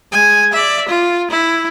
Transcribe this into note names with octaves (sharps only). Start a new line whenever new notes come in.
G#3 G#5
D5 E5
F4
E4